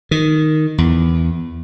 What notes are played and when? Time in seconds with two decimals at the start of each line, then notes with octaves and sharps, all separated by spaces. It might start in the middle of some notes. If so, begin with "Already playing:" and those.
0.11 D#3
0.78 E2